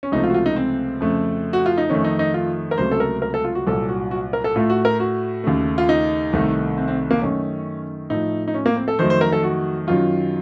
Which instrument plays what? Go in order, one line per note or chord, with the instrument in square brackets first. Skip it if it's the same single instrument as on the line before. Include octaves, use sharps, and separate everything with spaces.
[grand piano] C#4
C#2 C3 F3 A3 D#4
F4
F#4
F4
D#4
C4
F2 C#3 A3
F#4
F4
D#4
F2 D#3 A3 C#4
D#4
D#4
F4
A#4
C#2 C3 F#3 A3 C5
A4
A#4
A#4
A4
F4
F#4
C2 A#2 F#3 A4
F#4
F#4
A#4
A4
A2 A3 F4
F#4
A#4
F#4
D#2 C#3 A3
F4
D#4
C2 C3 D#3 A3
C4
C4
A#3
F#2 D#3 A3 C#4
A2 F3 A3 D#4
D#4
C#4
A#3
C4
A4
F2 D#3 F#3 A3 C5
C5
A#4
A4
F#4
F#2 D#3 F#3 F4